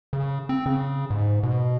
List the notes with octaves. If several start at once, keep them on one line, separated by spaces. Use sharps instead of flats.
C#3
C4
C#3
G#2
B2